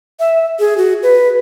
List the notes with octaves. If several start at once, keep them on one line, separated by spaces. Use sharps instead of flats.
E5
G#4
F#4
B4